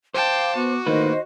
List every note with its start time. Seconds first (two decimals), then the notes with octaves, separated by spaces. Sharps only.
0.14 C5 F5 G5 A5 D6
0.56 B3 F#4 D6
0.86 A2 D#3 A#3 B4 C5 D#5